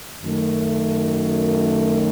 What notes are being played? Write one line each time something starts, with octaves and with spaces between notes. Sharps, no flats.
F#2 D#3 A3